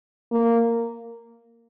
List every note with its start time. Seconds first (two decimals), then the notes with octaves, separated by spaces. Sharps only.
0.32 A#3